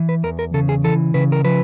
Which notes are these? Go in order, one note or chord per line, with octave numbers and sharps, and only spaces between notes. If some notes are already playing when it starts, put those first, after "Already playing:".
Already playing: E3
B4
E2 A#4
A#4
C#3 A4
G#4
E3 A4
C#3 B4
A#4
F3 B4